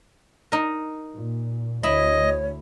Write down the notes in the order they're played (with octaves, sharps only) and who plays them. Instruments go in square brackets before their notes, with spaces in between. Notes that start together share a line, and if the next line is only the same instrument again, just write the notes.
[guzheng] D#4 A#4
[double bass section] A#2
[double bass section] D2 [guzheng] E4 B5 [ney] C#5 [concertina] D#5